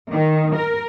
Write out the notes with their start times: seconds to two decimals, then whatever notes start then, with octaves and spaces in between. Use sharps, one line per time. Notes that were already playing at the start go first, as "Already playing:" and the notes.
0.11 D#3
0.55 A#4